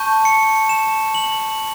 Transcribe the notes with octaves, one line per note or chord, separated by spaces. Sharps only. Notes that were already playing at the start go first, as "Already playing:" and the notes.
Already playing: A5 C#6 G6
C#7
E7
F#7